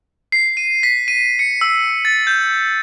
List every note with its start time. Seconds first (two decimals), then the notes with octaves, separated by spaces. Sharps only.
0.32 C7
0.57 D#7
0.83 B6
1.08 D#7
1.39 C#7
1.61 E6
2.05 A6
2.27 G6